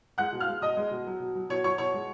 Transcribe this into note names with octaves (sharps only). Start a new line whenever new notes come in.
G#3 F#5 F#6
B2
F5 F6
G#3
B2 D#5 D#6
G#3
B2
F#3
B2
F#3
B2 C#5 C#6
F#3 C#5 C#6
B2 C#5 C#6
G#3